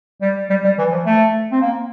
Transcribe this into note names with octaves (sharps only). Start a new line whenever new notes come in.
G3
G3
G3
E3
F3
A3
C4
A#3